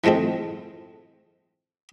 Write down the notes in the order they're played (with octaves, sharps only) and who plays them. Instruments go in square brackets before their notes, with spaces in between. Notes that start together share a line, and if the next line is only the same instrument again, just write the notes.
[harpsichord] E3 F3 G#3 A3 C4